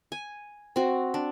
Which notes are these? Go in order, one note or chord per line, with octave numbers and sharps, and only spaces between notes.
G#5
C4 F#4
D4